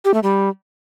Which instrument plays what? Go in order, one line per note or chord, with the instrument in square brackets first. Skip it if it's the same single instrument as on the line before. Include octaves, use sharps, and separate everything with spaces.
[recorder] G4
A3
G3